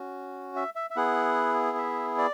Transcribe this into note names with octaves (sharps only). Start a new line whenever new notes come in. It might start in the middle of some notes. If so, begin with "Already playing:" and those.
Already playing: C#4 F#4
E5
E5
E5
B3 E4 G#4 F#5
E5
D5